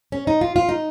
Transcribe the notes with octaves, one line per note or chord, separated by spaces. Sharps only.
C#4
D#4
F4
F4
D#4